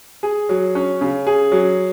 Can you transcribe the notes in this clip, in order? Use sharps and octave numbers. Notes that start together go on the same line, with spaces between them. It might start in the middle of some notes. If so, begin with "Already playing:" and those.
G#4
F#3
C#4
C#3
G#4
F#3